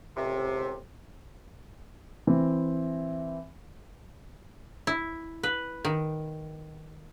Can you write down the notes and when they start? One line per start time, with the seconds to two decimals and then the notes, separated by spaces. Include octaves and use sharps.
0.17 C#2 A2 C3
2.27 E3 C4
4.87 E4
5.43 B4
5.85 D#3